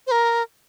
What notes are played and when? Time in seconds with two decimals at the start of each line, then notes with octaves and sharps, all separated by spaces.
0.07 C5
0.11 A#4